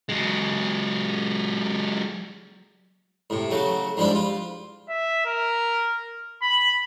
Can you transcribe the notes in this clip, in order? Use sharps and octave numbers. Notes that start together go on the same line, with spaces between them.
F#3 G#3
A2 C3
C#3 F#3 A3
G#2 F3 G3 D4 E4
F4
E5
A#4
B5